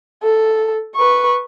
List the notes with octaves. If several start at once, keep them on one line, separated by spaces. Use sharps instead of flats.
A4
B4 C#6